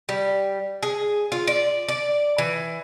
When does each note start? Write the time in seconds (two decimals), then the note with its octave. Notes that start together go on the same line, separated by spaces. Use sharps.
0.09 G3
0.83 G#4
1.32 F4
1.47 D5
1.88 D5
2.38 E3